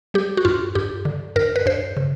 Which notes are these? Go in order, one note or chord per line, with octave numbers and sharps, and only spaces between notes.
G3 G4
F#4
G2 F4
G2 G4
D3
G2 A#4
B4
G2 C5
C#3